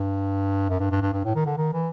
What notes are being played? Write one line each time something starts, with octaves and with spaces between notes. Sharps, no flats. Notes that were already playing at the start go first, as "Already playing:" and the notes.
Already playing: G2
F#2
G2
G2
G2
G2
A2
D#3
D3
D#3
E3